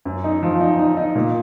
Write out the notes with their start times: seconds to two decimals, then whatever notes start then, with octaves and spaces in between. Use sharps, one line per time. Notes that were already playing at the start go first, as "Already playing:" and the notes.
0.05 F#2
0.24 D#4
0.43 F3
0.61 D#4
0.79 D#4
0.97 D#4
1.16 A#2